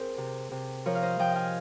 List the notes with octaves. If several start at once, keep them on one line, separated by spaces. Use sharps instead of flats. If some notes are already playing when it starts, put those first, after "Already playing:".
Already playing: C4 G#4 A#4 C5
C3
C3
F3 A#4 C#5
F5
C5 D#5
F3 D#5 G5
F5 G#5